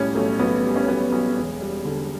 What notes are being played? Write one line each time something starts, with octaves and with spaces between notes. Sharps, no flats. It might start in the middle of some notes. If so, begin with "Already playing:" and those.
Already playing: B1 A2 G3 C#4
B1 A3
B1 B3
G3
C#4
B1 B3
B1
E1
G3
D3